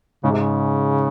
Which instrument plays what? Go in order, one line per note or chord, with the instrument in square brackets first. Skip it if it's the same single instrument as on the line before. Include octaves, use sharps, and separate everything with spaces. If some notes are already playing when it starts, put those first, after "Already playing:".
[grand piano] G#2 [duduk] C#3
[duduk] C3
C#3